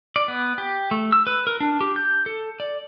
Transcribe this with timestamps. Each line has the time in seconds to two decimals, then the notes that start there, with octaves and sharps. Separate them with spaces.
0.16 D5
0.28 B3
0.58 G4
0.91 A3
1.12 E6
1.27 B4
1.47 A#4
1.61 D4
1.81 G4
1.96 G6
2.26 A4
2.60 D5